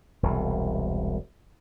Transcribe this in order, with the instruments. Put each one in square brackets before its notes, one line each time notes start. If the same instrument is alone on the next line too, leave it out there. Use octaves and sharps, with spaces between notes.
[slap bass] E1 C2